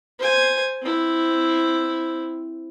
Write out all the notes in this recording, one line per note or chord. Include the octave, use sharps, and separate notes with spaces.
C5 G#5
C4 E4